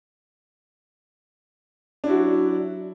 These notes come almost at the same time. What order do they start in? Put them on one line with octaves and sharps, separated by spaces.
D4 E4 F#4 F#3